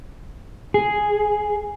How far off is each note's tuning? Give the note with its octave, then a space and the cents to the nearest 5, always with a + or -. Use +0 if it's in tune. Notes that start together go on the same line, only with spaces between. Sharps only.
G#4 +0